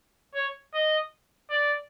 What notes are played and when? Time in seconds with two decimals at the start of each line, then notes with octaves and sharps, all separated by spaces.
0.35 C#5
0.74 D#5
1.50 D5